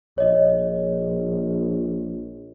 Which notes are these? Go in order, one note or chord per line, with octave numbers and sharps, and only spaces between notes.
A#1 C#5 D#5